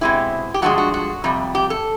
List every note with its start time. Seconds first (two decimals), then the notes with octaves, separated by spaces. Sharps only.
0.01 B2 G#3 C4 E4 G4
0.54 G4
0.62 G2 D3 F3 G#3 F#4
0.78 F#4
0.94 F#4
1.24 F2 C3 G3
1.55 G4
1.70 A4